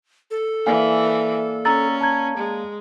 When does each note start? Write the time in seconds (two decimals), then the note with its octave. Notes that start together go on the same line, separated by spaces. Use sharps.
0.31 A4
0.66 E3 A#3 D5 F5 G#5
1.65 C#4 A#5 E6 A6
2.01 A5 A#5 G#6
2.37 G#3